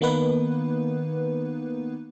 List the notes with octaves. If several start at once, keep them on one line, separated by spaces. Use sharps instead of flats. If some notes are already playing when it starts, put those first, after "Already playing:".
D#3 A#3 B3 D#4 B4